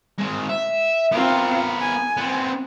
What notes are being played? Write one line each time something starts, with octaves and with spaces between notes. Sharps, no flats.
G#3 C4
E5
B3 C4 F4 A#4
G#5
B3 C4